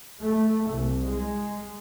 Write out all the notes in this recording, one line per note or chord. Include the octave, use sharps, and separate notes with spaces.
A3
C2
G#3